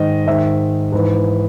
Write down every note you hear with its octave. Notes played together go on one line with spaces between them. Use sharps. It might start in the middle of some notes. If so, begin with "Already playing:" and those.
Already playing: G#2 D#3 D#5
G#2 D#3 E5
G#2 E3